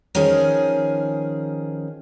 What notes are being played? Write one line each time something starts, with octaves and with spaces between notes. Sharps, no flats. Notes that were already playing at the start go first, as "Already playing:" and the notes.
D#3 F3 C#4 G#4